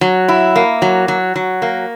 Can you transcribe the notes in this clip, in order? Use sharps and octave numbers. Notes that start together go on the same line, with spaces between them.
F#3
E4
A#3
F#3
F#3
F#3
A#3